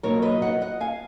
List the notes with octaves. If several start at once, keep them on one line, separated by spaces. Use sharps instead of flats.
B2 F#3 A#3 D#4 A#4 C#5
B4 D#5
D#5 F#5
D#5 F#5
F5 G#5